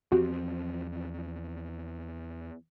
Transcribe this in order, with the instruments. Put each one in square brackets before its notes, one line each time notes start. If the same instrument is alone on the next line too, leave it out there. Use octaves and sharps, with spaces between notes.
[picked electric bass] E2 F3 C4 [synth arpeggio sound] F#4 G4